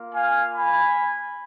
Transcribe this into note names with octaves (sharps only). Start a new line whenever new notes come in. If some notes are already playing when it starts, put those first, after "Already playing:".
Already playing: A#3 F4
F5 G#5
G#5 B5